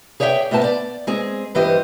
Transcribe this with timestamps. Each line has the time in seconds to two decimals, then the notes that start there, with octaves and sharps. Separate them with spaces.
0.20 G#4 C#5 D5 E5 F#5 G5
0.51 A2 A3 B3 C5 A5
0.64 D5
1.07 G#3 C4 G#4
1.55 G2 E3 G4 C5 D#5